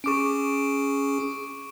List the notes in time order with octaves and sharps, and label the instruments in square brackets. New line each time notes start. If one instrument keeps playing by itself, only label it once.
[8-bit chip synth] C#4 G#4 [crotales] C#6 D6 D7